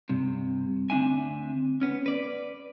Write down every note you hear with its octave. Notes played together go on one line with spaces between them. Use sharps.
G2 C3
D2 C4 D4 E5 G#5
B3 C#4
B4 D5